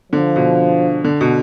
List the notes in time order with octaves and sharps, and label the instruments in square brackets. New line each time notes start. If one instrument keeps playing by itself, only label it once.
[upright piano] D3 [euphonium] F3
[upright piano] B2
D3
B2